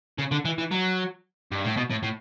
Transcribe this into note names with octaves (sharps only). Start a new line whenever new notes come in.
C#3
D3
E3
E3
F#3
G2
A2
B2
A2
A2